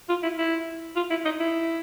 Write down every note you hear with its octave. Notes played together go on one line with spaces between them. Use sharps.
F4
E4
E4
F4
E4
D#4
E4